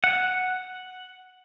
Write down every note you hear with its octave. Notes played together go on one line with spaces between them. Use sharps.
F#5